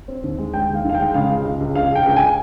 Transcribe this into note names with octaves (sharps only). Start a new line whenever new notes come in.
C4
D#2
G#3
G#3 G5
D#2
F5
D#3
F5
G#3 G5
C#3 F5
C#2
C#2
C#2
C#2 F5
C#2 G5
C#2 G5
G#5